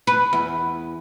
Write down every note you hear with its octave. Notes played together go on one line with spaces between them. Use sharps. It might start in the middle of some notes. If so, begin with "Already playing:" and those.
B4
E2